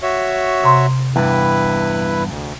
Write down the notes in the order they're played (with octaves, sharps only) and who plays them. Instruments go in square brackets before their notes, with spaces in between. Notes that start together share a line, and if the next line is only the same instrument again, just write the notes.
[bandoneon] F#4 C#5 E5
[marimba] C3 A#5 C6
[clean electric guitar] E2 G2 [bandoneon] E4 B4
[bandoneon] D2